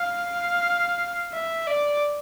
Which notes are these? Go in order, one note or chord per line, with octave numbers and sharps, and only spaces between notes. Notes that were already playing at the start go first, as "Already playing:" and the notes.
Already playing: F5
E5
D5